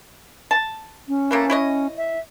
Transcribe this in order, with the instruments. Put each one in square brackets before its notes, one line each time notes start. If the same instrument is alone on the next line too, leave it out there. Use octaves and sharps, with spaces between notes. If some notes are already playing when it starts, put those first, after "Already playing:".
[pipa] A5
[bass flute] C#4
[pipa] E3 A3 A#3
E4 C#5 D#5
[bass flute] E5